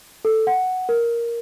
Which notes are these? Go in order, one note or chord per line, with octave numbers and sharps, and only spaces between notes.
A4
F#5
A#4